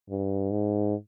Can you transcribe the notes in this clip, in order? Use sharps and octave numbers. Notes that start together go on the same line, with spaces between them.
G2
G#2